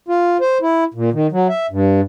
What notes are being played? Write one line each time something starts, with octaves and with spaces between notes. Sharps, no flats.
F4
C5
E4
A#2
D#3
F#3
E5
G2